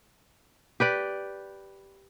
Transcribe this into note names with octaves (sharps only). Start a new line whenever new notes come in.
G4 B4 D5